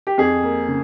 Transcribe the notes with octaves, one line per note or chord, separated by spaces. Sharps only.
G4
F2 G#4
A#3
C#3